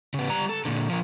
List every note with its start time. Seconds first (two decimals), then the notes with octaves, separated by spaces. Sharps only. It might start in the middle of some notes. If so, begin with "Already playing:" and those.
0.14 C#3 B3
0.29 G3 A#5
0.49 A4
0.65 A#2 D3
0.89 F3 A#4